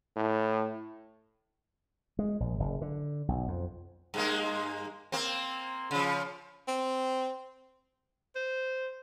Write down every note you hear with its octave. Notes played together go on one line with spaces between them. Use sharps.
A2
G#3
A#1
F#1
D3
B1
F2
G2 G#3 A#3
A#3 C4
C#3 F3
C4
C5